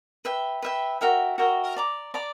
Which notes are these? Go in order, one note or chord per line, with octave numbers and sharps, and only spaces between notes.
B4 E5 G5
B4 E5 G5
F#4 A#4 E5 G5
F#4 A#4 E5 G5
D5 A#5 D6
D5 A#5 D6